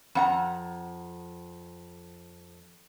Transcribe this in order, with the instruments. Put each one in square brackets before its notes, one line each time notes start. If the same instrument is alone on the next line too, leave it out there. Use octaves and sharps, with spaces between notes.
[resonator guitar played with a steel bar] F2 F#5 A#5